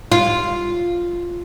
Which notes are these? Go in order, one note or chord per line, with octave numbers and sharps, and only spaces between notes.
F4